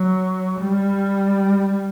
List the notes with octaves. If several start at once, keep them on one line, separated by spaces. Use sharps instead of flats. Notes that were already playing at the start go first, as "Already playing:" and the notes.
Already playing: F#3
G3